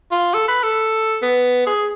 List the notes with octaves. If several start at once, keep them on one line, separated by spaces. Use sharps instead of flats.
F4
A4
B4
A4
B3
G#4